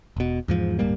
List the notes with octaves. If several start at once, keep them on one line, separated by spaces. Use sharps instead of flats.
E1 B2
E2 G#2 F3
D1 G2 G3 A#3